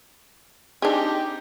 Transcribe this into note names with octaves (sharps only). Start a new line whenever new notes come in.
C4 D4 D#4 G4 G#4